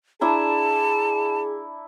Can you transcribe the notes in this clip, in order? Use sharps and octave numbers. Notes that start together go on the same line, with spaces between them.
D4 E4 G#4 A5 A#5